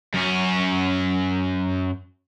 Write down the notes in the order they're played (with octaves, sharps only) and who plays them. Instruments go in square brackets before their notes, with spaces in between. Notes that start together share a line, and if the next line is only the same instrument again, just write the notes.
[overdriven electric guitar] F#2 C#4